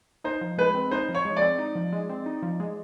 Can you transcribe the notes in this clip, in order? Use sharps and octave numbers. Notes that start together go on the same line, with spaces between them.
D#4 C5
F3
G#3 B4
C4
D#4 C5
F3
C#5
G#3
D5
C4
D#4
F3
G#3
C4
D#4
F3
G#3